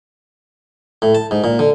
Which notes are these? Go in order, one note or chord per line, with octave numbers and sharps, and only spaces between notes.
A2
A5
G#2
A#2
D3